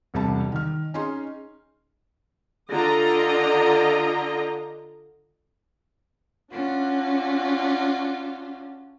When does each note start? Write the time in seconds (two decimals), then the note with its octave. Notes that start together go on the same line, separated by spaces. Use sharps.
0.14 E1 C2 C3 G3 A5
0.52 D#3 F6
0.94 C#4 D#4 G#4 C6
2.70 D3 F4 D#5 A#5
6.52 C#4 D4 F4 F#4